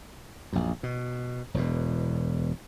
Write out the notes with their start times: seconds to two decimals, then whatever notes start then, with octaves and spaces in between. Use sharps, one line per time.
0.53 A#1 F#2
0.83 B2
1.54 E1 E2 B2